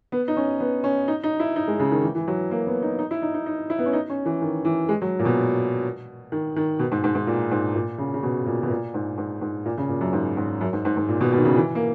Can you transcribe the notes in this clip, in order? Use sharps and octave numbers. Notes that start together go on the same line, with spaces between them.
B3
D#4
C#4
B3
C#4
D#4
D#4
E4
D#4
G#3
C#3
D#3
E3
E3
F#3
A#3
B3
D#4
D#4
E4
D#4
D#4
D#4
E4
B3
C#4
D#4
C#4
E3
D#3
E3
G#3
F#3
A#2
B2
D#3
D#3
B2
G#2
G#2
G#2
A#2
G#2
A#2
C#3
C#3
B2
A#2
B2
A#2
G#2
G#2
G#2
A#2
C#3
A#2
F#2
G#2
G#2
F#2
G#2
G#2
G#2
A#2
B2
B2
D#3
C#3
E3
A#3